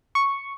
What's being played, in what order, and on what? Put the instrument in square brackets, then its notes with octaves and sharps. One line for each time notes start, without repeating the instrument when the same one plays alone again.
[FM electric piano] C#6